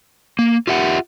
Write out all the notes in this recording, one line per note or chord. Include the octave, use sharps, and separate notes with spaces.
A#3
F4 G4 E5 F#5